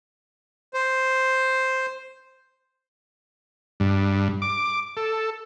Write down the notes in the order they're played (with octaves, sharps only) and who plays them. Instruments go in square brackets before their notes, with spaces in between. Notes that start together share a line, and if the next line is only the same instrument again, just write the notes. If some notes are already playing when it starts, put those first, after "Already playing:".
[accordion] C5
[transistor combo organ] G2
D6
A4